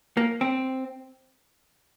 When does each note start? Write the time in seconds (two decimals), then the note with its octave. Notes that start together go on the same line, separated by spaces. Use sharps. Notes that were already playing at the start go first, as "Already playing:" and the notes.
0.17 A#3
0.41 C4